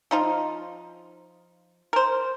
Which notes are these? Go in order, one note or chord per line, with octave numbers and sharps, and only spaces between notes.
F3 D#4 F4
A#4 C5